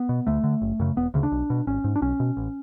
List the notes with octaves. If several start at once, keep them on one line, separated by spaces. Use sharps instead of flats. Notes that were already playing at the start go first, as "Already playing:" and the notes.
Already playing: B3
B2
D2 A3
D3
F#1
F#2 C#3
E1 B3
D2 C#3
D4
B1
B2
G#1 C#4
G#2
D4
B1 C#4
B2
A1